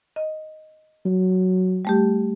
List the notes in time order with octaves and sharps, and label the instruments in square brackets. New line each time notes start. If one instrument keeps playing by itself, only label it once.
[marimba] D#5
[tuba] F#3
[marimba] G3 A3 G4